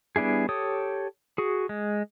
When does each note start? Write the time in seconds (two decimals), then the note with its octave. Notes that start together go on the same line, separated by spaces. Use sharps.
0.16 G3 B3 D4 E4 G#4
0.49 G4 A4 C#5 D#6
1.38 F#4 G#4
1.69 G#3